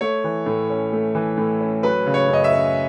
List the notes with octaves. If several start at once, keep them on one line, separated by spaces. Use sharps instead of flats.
A3 C#5
E3
A2
C#4
A3
E3
A2
C#4
F#3 B4
C#3
C#5
F#2 D#5
E5
C#4